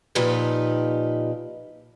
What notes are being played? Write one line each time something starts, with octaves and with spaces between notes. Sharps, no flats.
A#2 F3 D#4 G4 B4